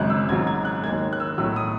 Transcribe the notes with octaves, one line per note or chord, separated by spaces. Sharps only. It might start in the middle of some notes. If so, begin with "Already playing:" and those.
Already playing: G#1 F#2 C#3 G#3 F#6
E6
G#1 G#2 F#3 G#6
G#6
F#6
D#2 D#3 G#3 G#6
F#6
E6
B1 A2 F#3 E6
D#6